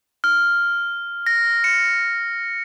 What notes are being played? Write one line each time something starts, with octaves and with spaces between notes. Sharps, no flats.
F6
A#6
C#7